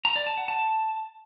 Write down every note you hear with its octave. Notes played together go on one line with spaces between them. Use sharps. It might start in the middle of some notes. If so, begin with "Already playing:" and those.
A#5
D5
A5
F#5
A5